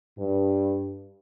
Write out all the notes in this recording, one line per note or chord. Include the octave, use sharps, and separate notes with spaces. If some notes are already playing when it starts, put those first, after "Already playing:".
G2